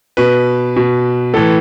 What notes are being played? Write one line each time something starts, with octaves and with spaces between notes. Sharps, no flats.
B2 B4
B2
A2 E3 A4